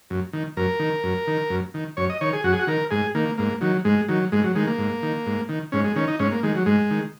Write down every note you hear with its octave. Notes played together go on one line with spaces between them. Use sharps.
F#2
D#3
F#2 A#4
D#3
F#2
D#3
F#2
D#3
F#2 C#5
D#5
D#3 C#5
G#4
F#2 F#4
G#4
F#4
D#3 A#4
G#2 G#4
D#3 A#3
G#2 A#3
D#3 F#3
G#2 G#3
D#3 F#3
G#2 G#3
F#3
D#3 G#3
A#3
G#2
D#3
G#2
D#3
G#2 C#4
G#3
D#3 C#4
D#4
G#2 C#4
A#3
D#3 G#3
F#3
G#2 G#3
D#3